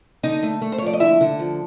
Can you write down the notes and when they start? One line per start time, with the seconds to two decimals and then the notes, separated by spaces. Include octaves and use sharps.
0.23 D3 D#4 D#5
0.43 A3
0.62 A3
0.72 C5
0.78 C#5
0.82 F3 D5
0.93 D#5
1.00 D3 E4 E5
1.21 D3
1.39 F3